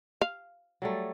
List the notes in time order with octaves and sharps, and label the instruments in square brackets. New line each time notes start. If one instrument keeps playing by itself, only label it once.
[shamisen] F5
[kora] F#3 G3 A3